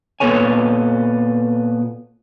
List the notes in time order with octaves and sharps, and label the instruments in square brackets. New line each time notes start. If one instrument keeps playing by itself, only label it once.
[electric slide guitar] A#2 B3 A4 C#5 G#5